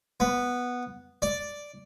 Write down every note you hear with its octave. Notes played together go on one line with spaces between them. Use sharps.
B3
D5